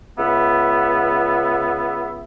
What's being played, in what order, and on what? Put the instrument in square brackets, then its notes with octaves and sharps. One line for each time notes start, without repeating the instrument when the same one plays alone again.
[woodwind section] C#2 B3 E5